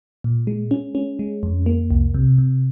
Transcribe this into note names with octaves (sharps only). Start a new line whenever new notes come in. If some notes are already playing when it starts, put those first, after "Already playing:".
A#2
G#3
C#4
C#4
G#3
F2
A#3
C2
C3
C3